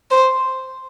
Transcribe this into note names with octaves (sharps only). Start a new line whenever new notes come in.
C5